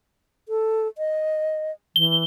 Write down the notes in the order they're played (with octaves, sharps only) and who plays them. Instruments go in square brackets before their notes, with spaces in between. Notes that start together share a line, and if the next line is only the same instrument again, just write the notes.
[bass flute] A4
D#5
[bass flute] E3 [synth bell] G7